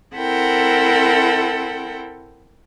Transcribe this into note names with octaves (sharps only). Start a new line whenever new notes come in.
C4 E4 A4 A#4 F#5 G5